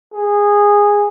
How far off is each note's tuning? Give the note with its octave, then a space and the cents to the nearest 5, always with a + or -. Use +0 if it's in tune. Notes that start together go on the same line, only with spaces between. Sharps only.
G#4 -15